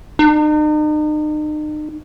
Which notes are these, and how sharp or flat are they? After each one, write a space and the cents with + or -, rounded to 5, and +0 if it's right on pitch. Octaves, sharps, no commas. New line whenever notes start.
D#4 -40